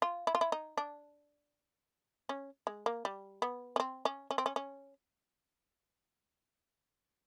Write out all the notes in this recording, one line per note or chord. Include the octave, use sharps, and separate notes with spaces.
F4
E4
F4
E4
D#4
D4
C#4
G#3
A#3
G3
B3
C#4
C4
C#4
C#4
C4
C#4
C#4